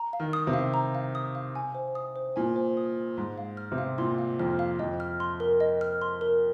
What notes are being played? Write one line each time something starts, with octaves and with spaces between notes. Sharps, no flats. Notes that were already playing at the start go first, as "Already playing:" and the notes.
Already playing: A#5
F5
D#3
D#6
C3
F5
A#5
F5
D#6
F5
G#5
C5
D#6
C5
A#2 G#5
C5
D#6
C5
G#2 C6
F5
F6
C3
F5
A#2 C6
F5
F2 F6
F5
F2 D#5
F6
C6
A#4
D#5
F6
C6
A#4